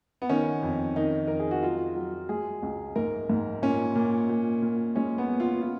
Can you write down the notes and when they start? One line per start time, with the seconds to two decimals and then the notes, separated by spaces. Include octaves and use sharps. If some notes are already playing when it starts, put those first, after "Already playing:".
0.22 B3
0.29 D#3 C#4
0.63 F2
0.96 D#3 D#4
1.28 F2 A#4
1.40 G#4
1.51 F#4
1.62 F#3 F4
1.96 F#3
2.29 G#3 G#4
2.63 C#2
2.96 G#2 A#4
3.30 G#2
3.62 A#2 C#4
3.96 A#2
4.29 A#2
4.62 A#2
4.96 G#3 C#4
5.18 B3
5.29 G#3
5.40 F4
5.62 F4